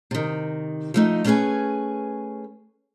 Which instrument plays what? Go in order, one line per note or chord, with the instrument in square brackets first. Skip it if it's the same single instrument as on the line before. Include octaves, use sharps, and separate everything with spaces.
[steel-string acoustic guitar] C3 D#3
F3 A3 D#4
A3 C#4 D4 G#4 B4 G#5